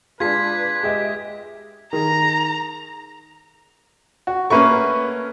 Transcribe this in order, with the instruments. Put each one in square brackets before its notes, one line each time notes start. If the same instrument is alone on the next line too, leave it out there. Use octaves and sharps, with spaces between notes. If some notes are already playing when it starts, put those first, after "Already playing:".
[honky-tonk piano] G#3 D4 [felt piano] F4 [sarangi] B4 [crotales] G#6 B6
[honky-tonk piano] G#3 D#5 E5 [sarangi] G4
[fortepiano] D#3 G#4 [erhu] A#5
[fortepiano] F#4
[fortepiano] A3 A#3 C#4 [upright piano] B4 E5 C#6